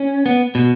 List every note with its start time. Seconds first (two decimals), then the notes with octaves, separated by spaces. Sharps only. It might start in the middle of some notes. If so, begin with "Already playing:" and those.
Already playing: C#4
0.26 B3
0.55 B2